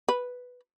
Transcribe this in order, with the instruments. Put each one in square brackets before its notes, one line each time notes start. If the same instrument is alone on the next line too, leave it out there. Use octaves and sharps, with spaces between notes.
[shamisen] B4